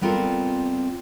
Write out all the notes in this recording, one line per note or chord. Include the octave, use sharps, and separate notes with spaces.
G3 B3 C4 F4 A4 A#4